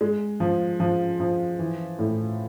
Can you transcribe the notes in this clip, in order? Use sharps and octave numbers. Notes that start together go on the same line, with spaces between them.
G#3
F3
F3
F3
E3
A2